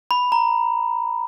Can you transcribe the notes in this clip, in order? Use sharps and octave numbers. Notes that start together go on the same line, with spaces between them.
B5
A#5